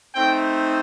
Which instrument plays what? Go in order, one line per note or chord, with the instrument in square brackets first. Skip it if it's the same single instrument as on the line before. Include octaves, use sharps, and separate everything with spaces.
[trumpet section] A3 C4 D#4 G5